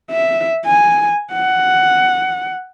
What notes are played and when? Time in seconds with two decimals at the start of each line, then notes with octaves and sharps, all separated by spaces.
0.11 E5
0.66 G#5
1.33 F#5